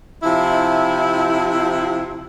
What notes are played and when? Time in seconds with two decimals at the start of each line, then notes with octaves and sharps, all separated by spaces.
0.23 C3 F3 E4